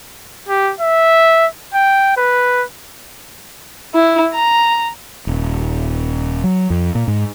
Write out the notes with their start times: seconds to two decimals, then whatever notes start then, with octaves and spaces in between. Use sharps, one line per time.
0.48 G4
0.80 E5
1.74 G5
2.17 B4
3.94 E4
4.34 A#5
5.27 D#1
6.44 F#3
6.70 F2
6.95 A#2
7.08 G#2